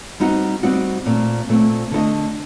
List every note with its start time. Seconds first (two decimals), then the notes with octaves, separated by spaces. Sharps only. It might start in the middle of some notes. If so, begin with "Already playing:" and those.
0.20 G3 C4 D#4 F#4
0.63 G3 C4 D#4 F#4
1.06 A#2 A3 C4
1.49 A#2 A3 C4
1.91 D3 A3 D4 A4 D#5